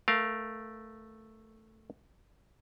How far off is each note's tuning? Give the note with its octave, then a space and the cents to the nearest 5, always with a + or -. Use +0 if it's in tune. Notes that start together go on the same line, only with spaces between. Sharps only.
A3 +0 A#4 +20 F5 +0